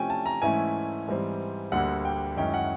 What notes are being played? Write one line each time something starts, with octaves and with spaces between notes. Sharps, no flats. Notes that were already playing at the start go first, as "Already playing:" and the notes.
Already playing: C3 F3 A3 C#4 E4 G5 G#5
A5
A#5
G#2 E3 A3 C#4 E4 G#5
G#2 E3 G3 C4
D2 D3 G3 A#3 F#5
G5
F#2 D#3 G#3 C#4 E4 G5
F#5